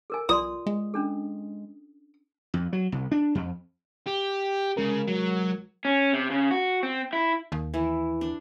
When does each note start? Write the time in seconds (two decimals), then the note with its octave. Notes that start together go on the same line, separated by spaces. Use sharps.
0.10 A4 A#4 G#5
0.29 B1 F4 D5 C6 D#6
0.66 G#3
0.94 C#4 D4 A4
2.54 F2
2.73 F#3
2.92 C2
3.12 D4
3.35 F2
4.06 G4
4.77 C2 C#3 G#3 A#4
5.07 F#3
5.85 C#4
6.13 C3
6.30 C#3
6.51 F#4
6.83 C4
7.13 E4
7.52 D#2
7.74 E3 E4
8.21 D4